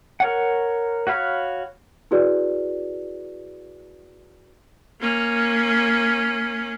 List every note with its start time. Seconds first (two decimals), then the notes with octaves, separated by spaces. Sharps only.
0.20 A#4 C#5 F#5
1.07 F#4 C#5 F5 B5
2.11 E4 F#4 G#4 B4 D5
5.00 A#3 C#4